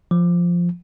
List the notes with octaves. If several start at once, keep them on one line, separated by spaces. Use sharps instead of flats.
F3